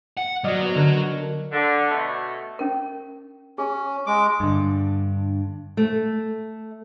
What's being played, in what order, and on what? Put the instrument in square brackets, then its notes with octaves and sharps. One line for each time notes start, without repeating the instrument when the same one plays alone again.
[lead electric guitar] F#5
[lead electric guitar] F#3 F#4 [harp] D5 D#5 F6
[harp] B3
D3 A#4 F#6
[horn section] D3
B2 A3
[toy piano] C#4 A#4
[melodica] C#4 [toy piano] G#4
[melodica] G#3 D6
[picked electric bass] G2 D3
[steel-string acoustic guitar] A3